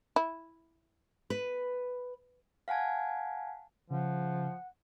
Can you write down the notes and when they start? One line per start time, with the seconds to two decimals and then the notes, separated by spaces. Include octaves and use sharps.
0.16 E4
1.30 B4
2.68 F5 F#5 G#5 A5 G#6
3.90 C#3 F3 F#5